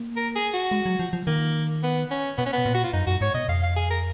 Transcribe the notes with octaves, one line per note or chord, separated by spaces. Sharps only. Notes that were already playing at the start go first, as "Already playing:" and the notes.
Already playing: A#3
A#4
G#4
F#4
G#3
F#3
F3
F3
D#3 A#3
B3
C#4
B2 B3
C#4
B3
A#2
F#4
F4
F#2 D#4
F#2 F#4
G#2 C#5
B2 D#5
F2 F5
F5
G#4
A#4